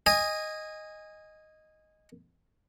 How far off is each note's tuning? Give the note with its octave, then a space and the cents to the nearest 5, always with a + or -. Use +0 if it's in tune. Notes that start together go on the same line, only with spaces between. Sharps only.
D#5 +0 G#5 -20